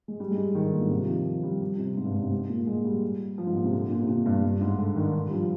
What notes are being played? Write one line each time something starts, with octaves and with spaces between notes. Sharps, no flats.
G#3
G3
G#3
G3
D#3
D3
A#2
G#2
C3
F3
D#3
F3
G3
G3
C3
G#2
G2
G#2
C3
G#2
A#2
G#3
G3
F3
G#2
A#2
C3
D3
A#2
C3
A#2
G2
G2
G#2
D3
D#3
D3
G3
F3